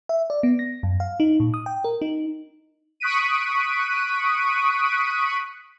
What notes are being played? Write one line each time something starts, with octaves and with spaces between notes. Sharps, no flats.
E5
D5
B3
A#6
F#2
F5
D#4
A#2
D#6
G5
A#4
D#4
C#6 D#6 F#6 B6 D7 D#7